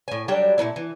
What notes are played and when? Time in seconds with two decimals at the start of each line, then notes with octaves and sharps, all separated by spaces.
0.08 A2 G#5
0.28 F#3 G3 D4 G5
0.58 A#2 A3 B3 E4
0.76 E3